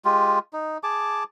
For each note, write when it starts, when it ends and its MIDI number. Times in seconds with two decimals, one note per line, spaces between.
0.05 0.39 56
0.05 0.39 65
0.05 0.39 67
0.53 0.78 63
0.83 1.24 68
0.83 1.24 81
0.83 1.24 86